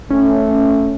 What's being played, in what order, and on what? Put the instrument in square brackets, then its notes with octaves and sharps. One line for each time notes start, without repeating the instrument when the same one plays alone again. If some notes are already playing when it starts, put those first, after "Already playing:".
[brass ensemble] A3 [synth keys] C#4